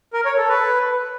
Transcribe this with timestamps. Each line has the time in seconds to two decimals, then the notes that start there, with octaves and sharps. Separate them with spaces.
0.13 A#4
0.25 C#5
0.37 A4
0.49 B4